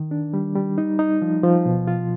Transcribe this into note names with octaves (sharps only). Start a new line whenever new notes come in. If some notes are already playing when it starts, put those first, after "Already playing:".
Already playing: D#3
D4
G3
G3
D#4
D#4
F3
F3
B2
F4